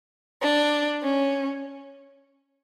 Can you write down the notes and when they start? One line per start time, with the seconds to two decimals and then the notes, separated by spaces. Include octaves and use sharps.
0.43 D4
1.03 C#4